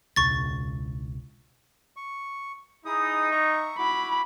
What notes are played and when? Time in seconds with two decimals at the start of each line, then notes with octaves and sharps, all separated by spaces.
0.16 E1 C#2 C#6 A6
1.96 C#6
2.86 D#4 E4 G#4 D#6
3.31 E5 A#5 C#6
3.78 E4 F#4 B5 D6